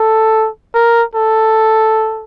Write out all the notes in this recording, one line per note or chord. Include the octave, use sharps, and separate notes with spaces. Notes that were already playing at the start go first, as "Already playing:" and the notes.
Already playing: A4
A#4
A4